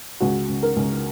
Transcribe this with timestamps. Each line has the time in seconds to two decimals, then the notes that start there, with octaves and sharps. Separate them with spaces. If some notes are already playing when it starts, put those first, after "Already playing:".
0.20 C#2 F#4
0.49 C#2
0.63 A#4
0.76 C#2